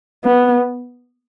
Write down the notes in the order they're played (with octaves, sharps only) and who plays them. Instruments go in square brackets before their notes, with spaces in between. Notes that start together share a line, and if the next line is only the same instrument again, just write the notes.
[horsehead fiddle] B3